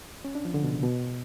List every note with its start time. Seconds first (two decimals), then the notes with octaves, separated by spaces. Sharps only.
0.24 C#4
0.35 D4
0.45 F3
0.54 D3
0.64 B2
0.74 C#3
0.83 B2